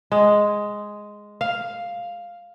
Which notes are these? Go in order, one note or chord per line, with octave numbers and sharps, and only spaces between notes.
G#3
F5